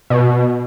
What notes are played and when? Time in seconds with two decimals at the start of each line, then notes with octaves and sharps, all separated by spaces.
0.10 B2